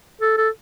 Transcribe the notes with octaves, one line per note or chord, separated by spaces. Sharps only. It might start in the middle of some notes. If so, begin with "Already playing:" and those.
A4
A4